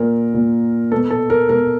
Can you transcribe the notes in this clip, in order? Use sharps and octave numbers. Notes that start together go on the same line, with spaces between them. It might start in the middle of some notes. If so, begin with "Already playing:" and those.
Already playing: A#2 A#4
A#2
B2 A4
A4
A#4
B2 A#4